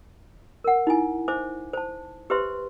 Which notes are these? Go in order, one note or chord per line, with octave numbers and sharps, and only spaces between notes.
A#4 F#5
D#4 E4 G#5
C5 E5 G#5 D6
C5 A5
G4 B4 C5 E5 C6